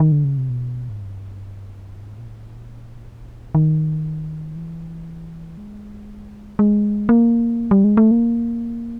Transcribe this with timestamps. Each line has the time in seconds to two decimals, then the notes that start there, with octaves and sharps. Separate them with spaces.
0.00 D#3
0.12 D3
0.24 C#3
0.37 C3
0.50 B2
0.89 G#2
1.01 G2
2.02 G#2
2.18 A#2
2.28 A2
2.53 A#2
3.55 D#3
4.56 E3
5.58 G#3
6.59 G#3
7.09 A#3
7.71 G3
7.84 G#3
7.97 A3
8.11 A#3